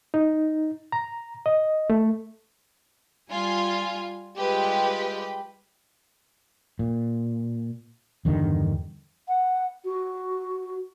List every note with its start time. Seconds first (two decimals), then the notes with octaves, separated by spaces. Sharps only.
0.14 D#4
0.92 A#5
1.46 D#5
1.90 A3
3.31 G3 F4 G#5
4.36 G3 G#3 F4 G4 B4
6.79 A#2
8.25 E2 G2 D3 D#3
9.28 F#5
9.85 F#4